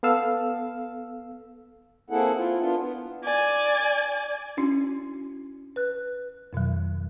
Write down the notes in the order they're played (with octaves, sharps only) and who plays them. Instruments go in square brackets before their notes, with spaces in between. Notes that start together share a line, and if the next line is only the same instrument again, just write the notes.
[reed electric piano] B3 A4 F5 E6
[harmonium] A#3 C4 E4 G#4 A4 F#5
E4 F4
B3 D4 F4
B3
[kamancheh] D5 G#5
[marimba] C#4 D4 E4 F#4
B4 F#6
F2 B2 D#3 F#3